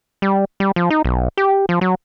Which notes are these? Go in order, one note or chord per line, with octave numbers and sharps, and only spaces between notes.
G3
G3
F3
D#4
B1
G4
F3
F#3